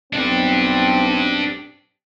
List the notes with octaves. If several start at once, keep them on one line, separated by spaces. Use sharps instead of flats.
B1 C4 D4 G4